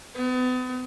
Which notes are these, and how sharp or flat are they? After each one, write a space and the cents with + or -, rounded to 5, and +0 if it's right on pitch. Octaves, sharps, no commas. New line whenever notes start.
B3 +40